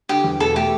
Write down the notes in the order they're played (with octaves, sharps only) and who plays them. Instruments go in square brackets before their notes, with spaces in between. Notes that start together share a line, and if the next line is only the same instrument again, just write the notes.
[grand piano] D3 [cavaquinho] G4
[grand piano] E2
[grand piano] E1 [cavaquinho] A4
[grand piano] A3 [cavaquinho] G4